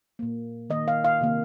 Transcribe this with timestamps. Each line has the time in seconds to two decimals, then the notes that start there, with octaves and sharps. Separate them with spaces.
0.19 A#2 A#3
0.70 D#3 A#3 D#5
0.88 F5
1.04 F5
1.21 C3 D#3 A#3